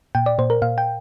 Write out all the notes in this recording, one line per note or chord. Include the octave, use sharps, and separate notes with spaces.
A#2 G5
D5
A#2 C5
A#4
A#2 F5
G5